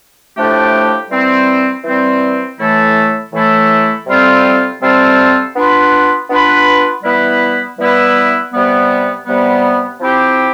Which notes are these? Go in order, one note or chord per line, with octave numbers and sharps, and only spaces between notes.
A2 F3 A3 D4 G4
E3 G3 C4
E3 G3 C4
A2 E3 A3 E4 A4
A2 E3 A3 E4 A4
C3 G3 C4 F4 A4
C3 G3 C4 F4 A4
B3 D4 F4 B4
B3 D4 F4 B4
E3 G3 B3 E4 B4
E3 G3 B3 E4 B4
C3 G3 B3
C3 G3 B3
F3 C4 E4 G4